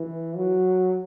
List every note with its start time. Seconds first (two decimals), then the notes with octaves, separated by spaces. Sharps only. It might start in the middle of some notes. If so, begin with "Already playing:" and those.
Already playing: E3
0.36 F#3